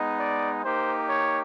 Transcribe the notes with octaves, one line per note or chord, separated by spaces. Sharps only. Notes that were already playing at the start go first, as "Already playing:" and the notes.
Already playing: G#3 B3 D#4
D5
A#3 D#4 G4 C5
C#5